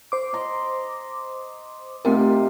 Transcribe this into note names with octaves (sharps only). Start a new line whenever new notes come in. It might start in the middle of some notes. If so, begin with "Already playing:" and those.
C5 D6
D#5 A#5 C6
C3 A3 C4 D#4 F4 A#4